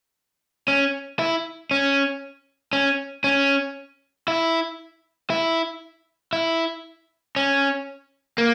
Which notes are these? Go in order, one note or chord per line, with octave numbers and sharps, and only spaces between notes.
C#4
E4
C#4
C#4
C#4
E4
E4
E4
C#4
A#3